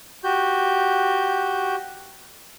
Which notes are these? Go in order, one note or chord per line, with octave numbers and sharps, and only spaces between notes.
F#4 G4 G6